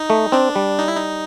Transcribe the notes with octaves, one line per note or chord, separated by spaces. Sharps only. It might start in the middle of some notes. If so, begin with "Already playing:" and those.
Already playing: D#4
A3
C4 D4
G3
D#4
E4
D#4